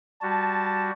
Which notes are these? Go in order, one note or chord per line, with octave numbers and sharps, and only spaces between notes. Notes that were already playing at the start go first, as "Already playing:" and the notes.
G3 F#4 A5